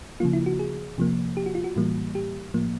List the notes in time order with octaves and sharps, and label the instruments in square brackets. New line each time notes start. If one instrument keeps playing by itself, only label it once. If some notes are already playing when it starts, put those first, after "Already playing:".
[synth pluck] C#3 F3 A#3 F4
E4
F#4
G#4
C3 F3 A#3
G4
F#4
F4
F#4
A2 E3 G3 A#3
G4
A2 F3 A#3